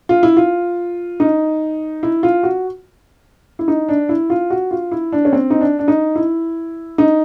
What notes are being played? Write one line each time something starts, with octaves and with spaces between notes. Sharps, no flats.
F4
E4
F4
D#4
E4
F4
F#4
E4
D#4
D4
E4
F4
F#4
F4
E4
D4
C#4
C4
D#4
D4
D4
D#4
E4
D#4